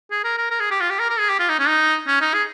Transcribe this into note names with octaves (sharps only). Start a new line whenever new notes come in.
G#4
A#4
A#4
A#4
G#4
G4
F4
G4
A#4
A#4
G#4
G4
F4
D#4
C#4
D#4
C#4
D#4
G#4